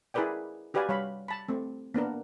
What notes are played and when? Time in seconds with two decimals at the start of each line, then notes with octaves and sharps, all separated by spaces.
0.14 E4 G#4 A#4 B4 D5 G5
0.74 F#4 G4 B4 D5 F5 G#5
0.89 G3 C#5 F5 B5
1.28 A5 B5
1.49 A3 C4
1.94 A#3 B3 D4 A#4